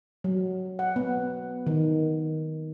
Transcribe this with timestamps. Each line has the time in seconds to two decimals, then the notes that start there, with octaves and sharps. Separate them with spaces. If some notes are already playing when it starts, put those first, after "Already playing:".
0.24 F#3
0.79 F#5
0.96 B3
1.67 D#3